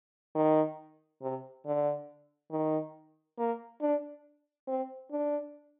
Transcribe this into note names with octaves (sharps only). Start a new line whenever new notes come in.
D#3
C3
D3
D#3
A#3
D4
C4
D4